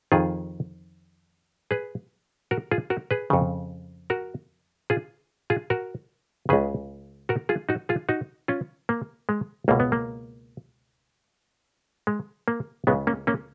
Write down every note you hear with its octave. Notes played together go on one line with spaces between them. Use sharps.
F2 D#3 F4 G#4
G#4 B4
F#4 A#4
F4 G#4
F#4 A#4
G#4 B4
F2 C#3
F#4 A#4
F4 G#4
F4 G#4
F#4 A#4
C#2 C#3 G#4 B4
F#4 A#4
F4 G#4
D#4 F#4
F4 G#4
D#4 F#4
C#4 F4
A#3
G#3
C#2 B2 A#3
B3
A#3
G#3
A#3
C#2 C#3 G#3 B3
A#3 C#4
A#3 C#4